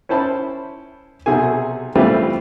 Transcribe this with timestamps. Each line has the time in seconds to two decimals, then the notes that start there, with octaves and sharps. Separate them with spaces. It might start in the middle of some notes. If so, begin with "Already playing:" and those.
0.09 C#4 E4 C5 A5 B5
1.26 B1 C3 F#4 G#4 A4 G#5
1.95 E3 G3 A3 C4 F4 G4